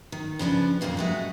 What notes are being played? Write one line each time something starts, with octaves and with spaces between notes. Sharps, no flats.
D#3
C#3 F3 D4 B4
F2 A#2 D3 A#3 C4
G#3 A3 F#4